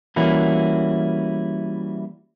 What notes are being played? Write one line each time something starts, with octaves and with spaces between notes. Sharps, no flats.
E3 G3 A#3 C#4 E4 F#4